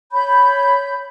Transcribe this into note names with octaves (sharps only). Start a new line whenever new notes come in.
C#5 B5 G6